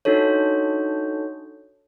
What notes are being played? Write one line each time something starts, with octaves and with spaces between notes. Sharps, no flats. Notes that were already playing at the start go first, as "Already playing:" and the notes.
D4 D#4 F#4 A4 C#5